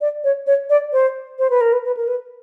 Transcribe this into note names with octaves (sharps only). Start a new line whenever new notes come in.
D5
C#5
C#5
D5
C5
C5
B4
A#4
B4
B4
A#4
B4